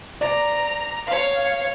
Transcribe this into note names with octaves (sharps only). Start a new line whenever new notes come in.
D5 A#5
C#5 F5